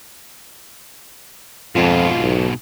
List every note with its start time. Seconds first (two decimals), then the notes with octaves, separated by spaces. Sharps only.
1.75 F2 G#2 B2 F4
2.20 B1